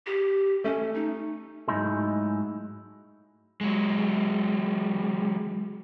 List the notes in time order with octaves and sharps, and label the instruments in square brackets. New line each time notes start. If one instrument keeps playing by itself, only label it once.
[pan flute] G4
[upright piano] A3 [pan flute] C#4
[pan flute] D#4
[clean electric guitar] G#2 F#3 A3 D#4 E4 G#4
[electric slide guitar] F#3 G#3